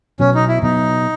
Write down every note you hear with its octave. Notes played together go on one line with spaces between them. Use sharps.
B2 F#3 B3 C#4
D#4
E4
B2 F#3 B3 D#4